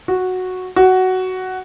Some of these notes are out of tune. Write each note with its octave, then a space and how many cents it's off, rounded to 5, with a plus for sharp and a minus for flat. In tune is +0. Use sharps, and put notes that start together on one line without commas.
F#4 -5
F#4 +10